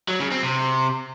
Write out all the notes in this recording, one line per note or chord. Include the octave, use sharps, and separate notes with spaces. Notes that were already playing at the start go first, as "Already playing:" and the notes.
F#3
C#3
C4
C3